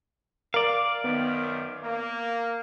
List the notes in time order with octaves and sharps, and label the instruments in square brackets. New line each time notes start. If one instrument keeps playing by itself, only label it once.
[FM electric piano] A#4 [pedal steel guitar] D5 F5
[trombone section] F#2 D#3 [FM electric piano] B3
[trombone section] A#3